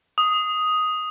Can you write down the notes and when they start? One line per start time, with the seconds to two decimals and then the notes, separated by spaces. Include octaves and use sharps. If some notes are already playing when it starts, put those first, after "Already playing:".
0.18 D#6